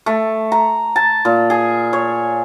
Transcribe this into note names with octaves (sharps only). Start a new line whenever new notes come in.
A3
A#5
A5
A#2
G#4
C#5